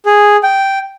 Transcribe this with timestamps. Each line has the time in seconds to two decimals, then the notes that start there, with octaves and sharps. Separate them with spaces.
0.06 G#4
0.43 G5